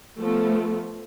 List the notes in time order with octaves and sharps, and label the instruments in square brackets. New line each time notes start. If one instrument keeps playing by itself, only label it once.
[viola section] F3 A3 B3